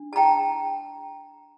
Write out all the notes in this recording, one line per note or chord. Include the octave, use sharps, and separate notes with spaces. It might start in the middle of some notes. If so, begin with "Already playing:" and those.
Already playing: D4
A5
G5 A#5